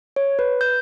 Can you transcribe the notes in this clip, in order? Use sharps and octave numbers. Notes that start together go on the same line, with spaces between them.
C#5
B4
G6